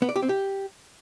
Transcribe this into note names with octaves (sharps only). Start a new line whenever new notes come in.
B3
D5
G4
C4
G4